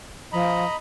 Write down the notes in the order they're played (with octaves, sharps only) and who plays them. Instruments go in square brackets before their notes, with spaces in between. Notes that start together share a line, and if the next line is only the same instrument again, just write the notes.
[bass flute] F3 [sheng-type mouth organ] D#5 A#5 B5